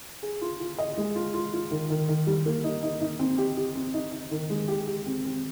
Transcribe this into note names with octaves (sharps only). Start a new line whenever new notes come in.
G#4
F4
F4
D#5
G#3
F4
F4
F4
D#3
D#3
D#3
G3
A#3
D#4
D#4
D#4
C4
G4
G4
C4
D#4
D#4
D#3
G#3
G4
G4
C4
C4